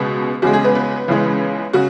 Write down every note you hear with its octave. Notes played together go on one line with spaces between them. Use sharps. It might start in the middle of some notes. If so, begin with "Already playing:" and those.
Already playing: C#2 B2 G#3 B3
E2 C#3 G#3 F#4
G#4
B3 B4
B3 B4
C#2 C#3 E3 G#3
C#3 F#4